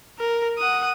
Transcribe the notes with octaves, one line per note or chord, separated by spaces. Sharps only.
A#4
F#5 D#6